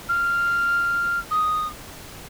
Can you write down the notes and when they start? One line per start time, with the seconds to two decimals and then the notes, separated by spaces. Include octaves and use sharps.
0.09 F6
1.31 D#6